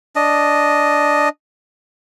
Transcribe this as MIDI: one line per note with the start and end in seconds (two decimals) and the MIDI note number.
0.16 1.29 62
0.16 1.29 75